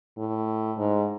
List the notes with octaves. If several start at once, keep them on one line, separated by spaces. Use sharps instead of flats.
A2
G#2